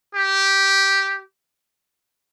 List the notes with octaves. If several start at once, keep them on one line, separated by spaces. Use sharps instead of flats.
G4